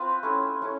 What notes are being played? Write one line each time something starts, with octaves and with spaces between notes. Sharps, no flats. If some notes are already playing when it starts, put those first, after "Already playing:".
Already playing: C4 F4 B4
A3 C#4 E4
A3 C#4 E4